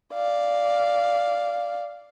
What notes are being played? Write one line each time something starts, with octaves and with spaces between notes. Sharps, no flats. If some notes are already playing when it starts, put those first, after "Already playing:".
D5 F5